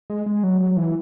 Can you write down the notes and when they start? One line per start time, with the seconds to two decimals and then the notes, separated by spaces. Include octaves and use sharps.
0.10 G#3
0.26 G#3
0.43 F#3
0.60 F#3
0.77 E3